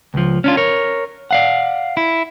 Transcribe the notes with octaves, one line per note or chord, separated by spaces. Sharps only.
C#2 F3
C#4 D4 F4
A#4 C#5
D5 F5 F#5
E4